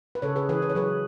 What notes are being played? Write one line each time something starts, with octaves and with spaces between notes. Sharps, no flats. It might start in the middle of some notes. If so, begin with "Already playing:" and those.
B4
C#3 A4 C#5
G#4 B4
E3 G#4 B4
B4
C#5
F#3 G#4 B4